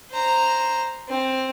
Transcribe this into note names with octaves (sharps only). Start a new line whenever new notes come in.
C5 A#5
C4